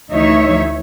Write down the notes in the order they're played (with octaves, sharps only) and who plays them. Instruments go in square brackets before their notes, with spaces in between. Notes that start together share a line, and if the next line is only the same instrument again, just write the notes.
[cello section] D2 E3 D#4 C#5 E5